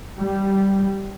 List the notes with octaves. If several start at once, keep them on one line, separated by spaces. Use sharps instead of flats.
G3